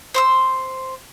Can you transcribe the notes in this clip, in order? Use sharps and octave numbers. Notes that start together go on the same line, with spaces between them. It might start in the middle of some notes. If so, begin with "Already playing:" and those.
C5 C6 E6